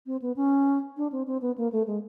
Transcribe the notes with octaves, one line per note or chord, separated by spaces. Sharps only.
C4
B3
C#4
D4
C4
C4
B3
A#3
A3
G#3